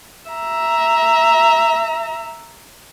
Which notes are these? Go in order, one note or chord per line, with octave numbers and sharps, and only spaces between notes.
E5 A#5